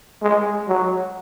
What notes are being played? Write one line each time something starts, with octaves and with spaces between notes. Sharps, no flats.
G#3
F#3